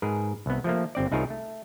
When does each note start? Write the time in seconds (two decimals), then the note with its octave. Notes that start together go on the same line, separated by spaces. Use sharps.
0.02 G#2 G#4 A#4 B4
0.46 C2 B3
0.64 F3 A3 A#3
0.95 G1 C4 D5
1.12 C2 D#4 F4 G#4 A#4 C#5
1.30 A3